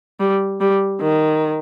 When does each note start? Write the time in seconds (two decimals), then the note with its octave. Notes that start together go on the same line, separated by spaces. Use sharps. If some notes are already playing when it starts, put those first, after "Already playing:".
0.20 G3
0.60 G3
1.01 D#3